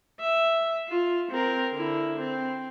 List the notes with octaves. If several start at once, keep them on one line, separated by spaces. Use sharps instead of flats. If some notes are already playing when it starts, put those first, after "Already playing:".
E5
F4
C4 A#4
D3 E4
C4